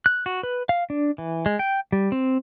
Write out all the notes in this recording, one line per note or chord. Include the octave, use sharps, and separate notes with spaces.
F#6
F#4
B4
F5
D4
E3
G#3
G5
G3
C4